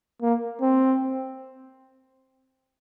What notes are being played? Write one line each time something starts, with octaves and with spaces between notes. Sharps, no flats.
A#3
C4